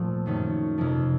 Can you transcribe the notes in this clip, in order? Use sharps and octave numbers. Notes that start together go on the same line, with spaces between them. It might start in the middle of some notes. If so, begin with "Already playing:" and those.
Already playing: A#2 F3 A3 C4
F#2 D#3 A3 C#4
F2 C3 F3